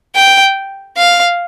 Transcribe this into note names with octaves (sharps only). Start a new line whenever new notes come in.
G5
F5